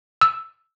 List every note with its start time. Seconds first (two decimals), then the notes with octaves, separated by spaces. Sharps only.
0.21 E6